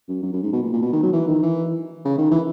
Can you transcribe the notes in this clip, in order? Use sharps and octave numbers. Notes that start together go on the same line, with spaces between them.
F#2
F#2
F#2
G#2
B2
A#2
A#2
B2
D#3
F#3
E3
D#3
E3
C#3
D#3
E3